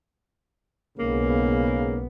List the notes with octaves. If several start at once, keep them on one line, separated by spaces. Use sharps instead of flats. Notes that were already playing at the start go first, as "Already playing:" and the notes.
B1 G#2 C#3 A#3 B3